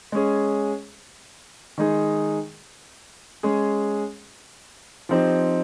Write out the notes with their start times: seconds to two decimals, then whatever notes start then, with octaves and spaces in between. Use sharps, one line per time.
0.12 G#3 C#4 G#4
1.78 D#3 G#3 D#4 G#4
3.43 G#3 C#4 G#4
5.09 F3 C4 D#4 G4